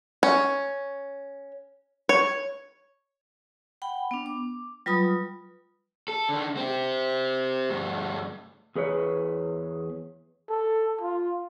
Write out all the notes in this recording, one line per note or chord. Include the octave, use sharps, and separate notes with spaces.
C#4
C#5
F#5 G5 B5
B3 D4
D6
F#3 G3 F4 B4 B5 D#6
A4
D3 D#3
C4 G4
D2 G2
E2 G#4 B4 C#5
A4
F4